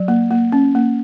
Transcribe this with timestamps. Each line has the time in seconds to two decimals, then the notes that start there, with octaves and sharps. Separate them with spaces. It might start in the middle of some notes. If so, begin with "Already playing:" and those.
Already playing: F#3
0.08 A#3
0.31 A#3
0.52 C#4
0.75 A#3